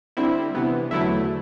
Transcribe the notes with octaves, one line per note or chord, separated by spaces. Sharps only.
D3 G3 C4 E4
C3 E3 B3
E2 D3 F#3 A3 E4